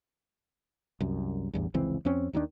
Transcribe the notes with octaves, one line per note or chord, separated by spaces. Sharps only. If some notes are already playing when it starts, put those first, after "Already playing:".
C2 F#2
A1 E2 G2
F1 C#2 E3 C4
F2 C4 C#4
D#2 D#3 F3 D4